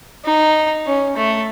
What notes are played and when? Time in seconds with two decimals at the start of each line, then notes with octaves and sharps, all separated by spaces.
0.25 D#4
0.86 C#4
1.17 A3